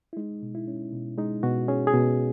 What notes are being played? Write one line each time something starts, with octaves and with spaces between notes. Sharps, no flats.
E4
G#3 D#4
B2
E4
C#4
B2
G#3 D#4
B2 F#4
C#4 G#4
G#4
B2